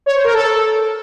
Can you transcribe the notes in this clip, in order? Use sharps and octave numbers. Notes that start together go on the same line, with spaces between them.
C#5
C5
A#4
A4